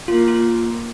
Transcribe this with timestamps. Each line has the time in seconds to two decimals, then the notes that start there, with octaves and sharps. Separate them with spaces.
0.08 A#3 F4
0.28 F4